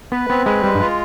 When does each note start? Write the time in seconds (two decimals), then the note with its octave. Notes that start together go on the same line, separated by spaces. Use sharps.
0.12 B3 B4
0.30 B3 C4
0.46 G#3 B4
0.64 G3 G#3
0.75 G2
0.81 F4